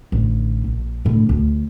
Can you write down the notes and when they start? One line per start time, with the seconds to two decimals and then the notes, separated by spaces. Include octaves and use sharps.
0.12 A1 D3
0.64 A#1
1.05 A2 D3
1.29 D2